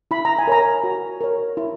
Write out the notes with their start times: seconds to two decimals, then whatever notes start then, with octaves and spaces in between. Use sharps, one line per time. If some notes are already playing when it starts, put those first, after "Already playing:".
0.11 E4 B5
0.25 A#5
0.39 G#5
0.47 A#4 C#5 A#5
0.84 F#4
1.21 A#4 C#5
1.57 E4